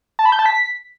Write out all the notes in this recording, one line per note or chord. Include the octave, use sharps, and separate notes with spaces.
A5
B5
G6
A5
B6